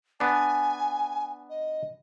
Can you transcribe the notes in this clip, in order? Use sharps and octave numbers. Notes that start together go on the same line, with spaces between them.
B3 D4 G#5
D#5